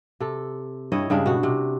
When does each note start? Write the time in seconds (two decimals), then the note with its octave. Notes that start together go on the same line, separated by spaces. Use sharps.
0.20 C3 A4
0.92 G2 E4 C#5 D#5
1.10 G2 C#3 G#3 D4
1.26 B2 F#4
1.43 C3